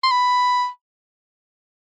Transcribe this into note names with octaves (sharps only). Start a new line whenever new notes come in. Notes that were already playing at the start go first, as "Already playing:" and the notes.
C6
B5